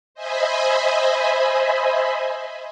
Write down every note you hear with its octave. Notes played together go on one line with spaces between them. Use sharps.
C5 D#5 E5 G#5 B5